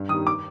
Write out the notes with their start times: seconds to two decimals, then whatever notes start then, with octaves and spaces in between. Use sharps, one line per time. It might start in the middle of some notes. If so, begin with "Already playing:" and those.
Already playing: G2
0.09 D#3 G3 D#6
0.27 D6